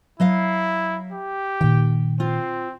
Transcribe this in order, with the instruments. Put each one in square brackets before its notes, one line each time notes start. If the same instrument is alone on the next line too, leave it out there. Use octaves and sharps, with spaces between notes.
[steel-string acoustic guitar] F#3 D#5 F5 [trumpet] E4
[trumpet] G4
[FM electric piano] A#2 D#3 [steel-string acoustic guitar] G5
[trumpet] C4 [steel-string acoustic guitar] F4